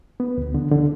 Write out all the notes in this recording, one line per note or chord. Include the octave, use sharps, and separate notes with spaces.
B3
D2
D3
D3